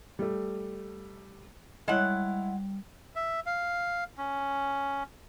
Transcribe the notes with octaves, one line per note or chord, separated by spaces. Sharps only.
G3 A3
G3 G#3 E4 C#5 F#5
E5
F5
C#4